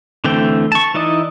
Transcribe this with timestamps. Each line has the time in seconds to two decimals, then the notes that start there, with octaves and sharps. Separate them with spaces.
0.24 D3 E3 A3 C4 G5
0.72 A5 C#6
0.94 E3 D#4 E4 D5 D#5